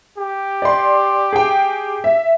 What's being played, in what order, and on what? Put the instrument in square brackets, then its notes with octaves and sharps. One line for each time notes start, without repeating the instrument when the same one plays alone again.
[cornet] G4
[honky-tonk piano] D5 C6
G#4 G5
E5